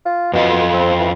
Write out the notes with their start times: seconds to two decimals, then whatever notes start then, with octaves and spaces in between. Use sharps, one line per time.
0.05 F4
0.33 F2 B2 F4 D#5
0.73 C4
1.00 E3